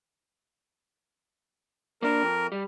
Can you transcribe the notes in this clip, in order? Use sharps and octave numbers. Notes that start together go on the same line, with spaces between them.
A#3 D4 A#4
F2
G3